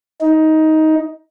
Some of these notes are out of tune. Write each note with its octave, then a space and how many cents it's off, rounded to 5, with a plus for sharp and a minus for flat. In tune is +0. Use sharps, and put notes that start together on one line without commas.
D#4 +15